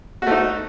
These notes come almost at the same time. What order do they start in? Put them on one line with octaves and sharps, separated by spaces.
F#4 A3 D#4